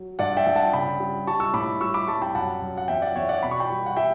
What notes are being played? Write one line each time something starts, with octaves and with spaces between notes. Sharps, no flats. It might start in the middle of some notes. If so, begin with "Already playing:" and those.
Already playing: F#3
G2 D5 F#5
E5 G5
G2
F#5 A5
C#3 G5 B5
G3
G3 A5 C#6
C#6 E6
A2 B5 D6
G3 C#6 E6
B5 D6
G3 A5 C#6
G5 B5
F#2 F#5 A5
F#2
F#5
E2 E5 G5
D5 F#5
E2 C#5 E5
D5 F#5
B2 B5
C#6
G5 B5
G3
F#5
G3 E5 G5